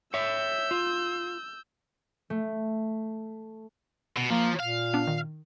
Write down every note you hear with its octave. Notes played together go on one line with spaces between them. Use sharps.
C#5 E5 E6 G6
F4
A3
B2
F3 A#3
A#2 F5
B3 D4
D#3